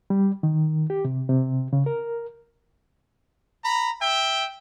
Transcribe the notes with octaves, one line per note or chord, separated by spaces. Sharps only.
G3
D#3
G4
C3
C3
C#3
A#4
A#5 B5
E5 G5